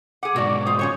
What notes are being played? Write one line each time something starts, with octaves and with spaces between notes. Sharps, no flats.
G#4 F#5 D6
B1 G#2 F#4 D5
F4 C5 D#6
F3 C#4 C#5 C#6